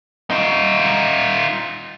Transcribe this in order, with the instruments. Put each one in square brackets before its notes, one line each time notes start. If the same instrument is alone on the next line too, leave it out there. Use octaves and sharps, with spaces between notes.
[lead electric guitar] D#4 F4